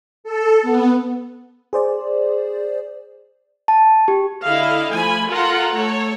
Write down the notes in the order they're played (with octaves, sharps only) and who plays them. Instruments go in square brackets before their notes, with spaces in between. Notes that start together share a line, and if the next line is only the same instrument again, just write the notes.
[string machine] A4
B3
[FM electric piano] G#4 C5 D5
[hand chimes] A5
G4
[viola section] D3 E4 A4 D#5 F5
F3 A3 G#5 B5
F4 A4 A#4 F#5 A#5
A3 A4 C#5